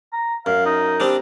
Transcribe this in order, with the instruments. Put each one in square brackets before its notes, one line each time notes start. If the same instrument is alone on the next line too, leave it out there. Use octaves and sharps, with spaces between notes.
[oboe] A#5
[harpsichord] F#2 [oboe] F5
[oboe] D#4
[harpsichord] G3 C4 D4